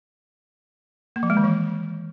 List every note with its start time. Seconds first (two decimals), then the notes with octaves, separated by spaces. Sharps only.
1.16 A#3
1.23 F3
1.30 G#3
1.37 D#3
1.44 E3